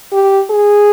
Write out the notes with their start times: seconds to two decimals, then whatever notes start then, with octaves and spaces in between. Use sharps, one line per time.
0.13 G4
0.51 G#4